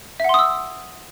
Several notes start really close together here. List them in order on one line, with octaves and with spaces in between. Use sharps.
E5 F#5 C6 D#6 E6